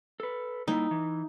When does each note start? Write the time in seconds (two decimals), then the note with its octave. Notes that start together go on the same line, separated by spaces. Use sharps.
0.20 A4 B4
0.68 G3 A#3 D#4 E4
0.91 E3